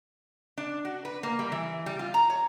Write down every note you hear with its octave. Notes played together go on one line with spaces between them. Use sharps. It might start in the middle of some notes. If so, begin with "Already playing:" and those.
D4
F#4
B4
A#3
G3
E3
G3
F4
A#5
C#5